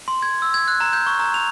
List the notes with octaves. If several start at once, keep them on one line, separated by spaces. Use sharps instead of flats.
C6
G#6
E6
G#6
F#6
A#5
G6
C#6
A#5
F7